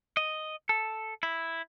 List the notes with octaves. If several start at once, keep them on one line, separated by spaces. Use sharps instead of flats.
D#5
A4
E4